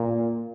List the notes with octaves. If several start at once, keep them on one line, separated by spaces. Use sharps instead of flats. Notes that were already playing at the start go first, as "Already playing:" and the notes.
Already playing: A#2